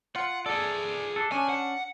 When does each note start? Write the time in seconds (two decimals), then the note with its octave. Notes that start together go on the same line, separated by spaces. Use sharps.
0.16 F4 F#5
0.46 G#4 A4 D5
1.16 D4 A4
1.32 C#4 D4 G#5
1.49 F#5